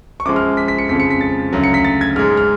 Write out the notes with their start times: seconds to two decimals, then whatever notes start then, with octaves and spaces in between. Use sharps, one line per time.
0.20 C#6
0.25 F#2 F3 G#3 D6
0.36 F6
0.57 B6
0.68 B6
0.78 C#7
0.89 F2 C#3 F3 G#3 B6
1.00 C#7
1.10 B6
1.21 A6
1.53 D2 C#3 F#3
1.64 C#7
1.74 B6
1.84 A6
2.01 G#6
2.16 G#2 G#3 F6
2.37 F6